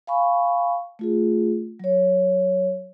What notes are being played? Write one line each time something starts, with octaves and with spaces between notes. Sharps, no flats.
F5 G#5 B5 C#6
A3 F4 G#4
F#3 C#5